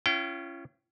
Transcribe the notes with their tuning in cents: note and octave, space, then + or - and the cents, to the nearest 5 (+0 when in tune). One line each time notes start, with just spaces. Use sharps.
C#4 +0 F4 -45 G5 -30